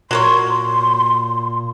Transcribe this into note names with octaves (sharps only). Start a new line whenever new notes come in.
A#2 F#3 A#3 C#5 C6